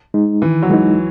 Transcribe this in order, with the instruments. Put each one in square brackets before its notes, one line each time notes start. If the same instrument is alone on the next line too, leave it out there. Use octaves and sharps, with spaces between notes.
[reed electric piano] G#3 D#4
[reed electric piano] D#3 [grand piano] E3
[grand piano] F#3
[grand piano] E3 [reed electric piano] G#3 D#4